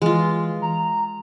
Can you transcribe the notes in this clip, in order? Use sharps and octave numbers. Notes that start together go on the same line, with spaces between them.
E3 G#3 F4
A#5